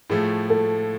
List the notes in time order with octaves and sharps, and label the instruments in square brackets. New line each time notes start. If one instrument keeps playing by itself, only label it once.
[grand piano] A2 F3 A3 [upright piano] G#4
[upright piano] A4